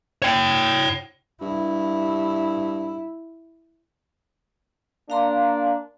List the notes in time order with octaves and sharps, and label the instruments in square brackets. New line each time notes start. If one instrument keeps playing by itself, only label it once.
[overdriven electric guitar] C#5 G5
[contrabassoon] G2 [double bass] E4
[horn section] A#3 D4 [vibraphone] F5 A#5 C6